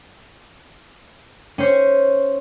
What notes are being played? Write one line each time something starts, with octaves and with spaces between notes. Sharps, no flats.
C#4 C5 C#5